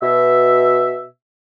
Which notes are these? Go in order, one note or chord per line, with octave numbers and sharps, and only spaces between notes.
B2 E5